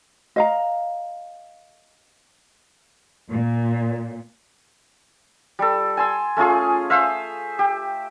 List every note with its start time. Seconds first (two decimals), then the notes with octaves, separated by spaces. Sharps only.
0.36 D#5 F5 A#5
3.30 A#2
5.59 G3 A4
5.97 G#5 A5 C6 E6
6.37 A3 C#4 F4 G#4
6.90 C5 E5 F5
7.59 G4